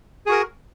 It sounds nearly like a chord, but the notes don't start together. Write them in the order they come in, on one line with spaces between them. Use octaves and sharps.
G#4 F#4 A#4